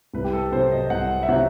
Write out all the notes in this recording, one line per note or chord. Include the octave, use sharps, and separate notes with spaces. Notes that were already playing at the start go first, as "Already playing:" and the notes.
C2 B4
G4
A4
C3 F#3 C5
D#5
C2 F#5
E5
C3 F#3 F#5